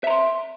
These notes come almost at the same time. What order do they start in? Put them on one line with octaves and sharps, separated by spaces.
E5 A#5 C6